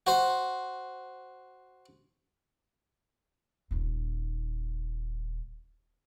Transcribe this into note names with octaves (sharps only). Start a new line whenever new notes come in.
F#4 C5
D#1 D#4